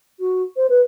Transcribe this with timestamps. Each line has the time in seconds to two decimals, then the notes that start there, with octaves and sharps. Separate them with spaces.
0.20 F#4
0.56 C5
0.69 B4